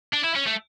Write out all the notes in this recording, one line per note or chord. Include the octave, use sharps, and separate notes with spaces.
D4
E4
C#4
A3